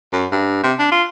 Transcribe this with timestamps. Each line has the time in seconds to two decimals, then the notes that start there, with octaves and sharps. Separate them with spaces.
0.13 F#2
0.32 G2
0.64 C3
0.79 D4
0.92 F4